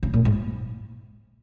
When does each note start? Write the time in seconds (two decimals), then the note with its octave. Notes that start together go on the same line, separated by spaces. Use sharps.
0.03 C#3
0.14 A#2
0.25 G#2